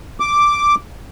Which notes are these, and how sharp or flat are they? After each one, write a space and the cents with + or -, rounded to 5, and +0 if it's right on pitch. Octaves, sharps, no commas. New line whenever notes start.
D6 +0